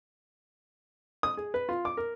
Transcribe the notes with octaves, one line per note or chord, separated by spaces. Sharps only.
D#6
G#4
B4
F4
D6
A#4